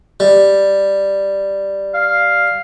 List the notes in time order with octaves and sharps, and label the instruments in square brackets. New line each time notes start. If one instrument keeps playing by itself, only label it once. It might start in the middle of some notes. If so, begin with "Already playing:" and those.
[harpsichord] G3
[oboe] F5